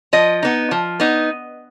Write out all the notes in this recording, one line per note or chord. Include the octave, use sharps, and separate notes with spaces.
F3 D#5
B3 D#4
F3
B3 D#4